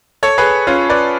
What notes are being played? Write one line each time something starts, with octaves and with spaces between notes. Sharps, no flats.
A4 C#5
G#4 B4
C#4 F4
B4 D5